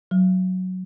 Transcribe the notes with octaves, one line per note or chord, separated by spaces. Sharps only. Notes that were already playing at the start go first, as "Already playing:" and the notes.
F#3